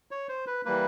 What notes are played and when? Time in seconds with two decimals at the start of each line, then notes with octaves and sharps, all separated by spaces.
0.11 C#5
0.29 C5
0.47 B4
0.65 E3 G3 A#3 B4